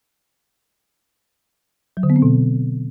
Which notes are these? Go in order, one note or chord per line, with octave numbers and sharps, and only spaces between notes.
F#3
D3
B3
C4
B2